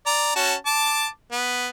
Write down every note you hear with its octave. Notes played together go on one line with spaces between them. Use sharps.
D5 A#5
C#4 F#4 A5
A5 D6
B3